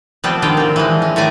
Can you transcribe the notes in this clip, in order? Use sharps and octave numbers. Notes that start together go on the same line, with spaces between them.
F3 G3 B3 C4 G4
D3 D#3 F4 G4
F#3 C4
E3 F3 G#3
C#4
A2 D#3 A3 D5 G#5 A#5